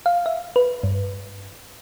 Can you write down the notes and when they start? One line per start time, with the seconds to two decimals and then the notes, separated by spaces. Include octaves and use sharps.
0.06 F5
0.26 E5
0.56 B4
0.83 G2